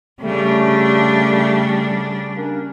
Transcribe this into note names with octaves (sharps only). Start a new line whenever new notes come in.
C#3 G3 A3 D4
A#3 C#4 D4